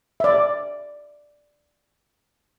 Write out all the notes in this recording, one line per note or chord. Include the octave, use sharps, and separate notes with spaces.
D5 E5